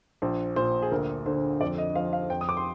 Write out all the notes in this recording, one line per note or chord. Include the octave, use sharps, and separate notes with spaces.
A#1 C5
A#2 C5
G#4
D2 A#4
D3 C5
F2 D5
D#5
F3 F5
F5
F2 G5
D#6
D6
C6